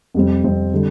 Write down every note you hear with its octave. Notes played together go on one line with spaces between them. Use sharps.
F2 C3 G3 C4
F2 C3 G3 C4
D3 G3